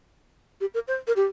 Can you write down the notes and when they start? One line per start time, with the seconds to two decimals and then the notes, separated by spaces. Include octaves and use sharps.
0.61 G4
0.74 A#4
0.88 C5
1.07 A#4
1.16 G4